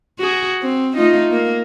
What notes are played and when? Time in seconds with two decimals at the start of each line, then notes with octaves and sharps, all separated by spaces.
0.19 F#4 G#4
0.62 C4
0.96 A3 D#4 F4
1.31 A#3